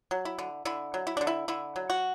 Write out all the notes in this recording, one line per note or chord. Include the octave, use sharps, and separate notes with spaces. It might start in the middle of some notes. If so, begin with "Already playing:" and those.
F#3
E4
D3
D3 E4
F#3
E4
D3 D4
E4
D3 E4
F#3
F#4